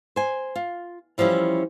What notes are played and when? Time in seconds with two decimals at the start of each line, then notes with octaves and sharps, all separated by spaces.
0.16 C5 G#5
0.56 F4
1.18 E3 F3 G3 C#4 E4